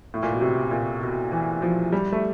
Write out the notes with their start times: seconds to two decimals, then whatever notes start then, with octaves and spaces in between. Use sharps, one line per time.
0.14 A2
0.23 A#2
0.32 B2
0.41 C3
0.71 A#2
1.02 B2
1.32 E3
1.62 F3
1.93 G3
2.12 A3